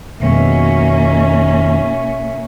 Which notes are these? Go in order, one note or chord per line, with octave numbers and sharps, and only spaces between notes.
F2 B2 D#3 G#3 A#3 B3 C#4 E5